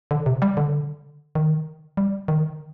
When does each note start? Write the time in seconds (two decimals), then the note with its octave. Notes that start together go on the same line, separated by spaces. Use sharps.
0.11 D3
0.26 C3
0.42 G3
0.57 D3
1.35 D#3
1.97 G3
2.28 D#3